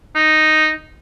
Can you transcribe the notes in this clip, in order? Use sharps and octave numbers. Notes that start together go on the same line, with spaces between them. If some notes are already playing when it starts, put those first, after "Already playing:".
D#4